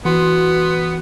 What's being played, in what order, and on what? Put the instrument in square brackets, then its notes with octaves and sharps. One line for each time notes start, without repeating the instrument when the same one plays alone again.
[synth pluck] E3 F#4 C6 [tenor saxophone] B3